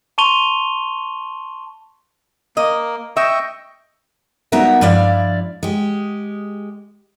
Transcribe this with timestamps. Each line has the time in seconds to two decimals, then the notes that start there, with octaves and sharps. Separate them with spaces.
0.18 A5 C6 C#6 D#7 F7 G7
2.57 A#3 D#5
3.17 D#5 E5 G5 C#6
4.52 G3 B3 D#4 F#4 A#4 E5
4.81 G2 F3 E4 D5 F5
5.63 G#3 G4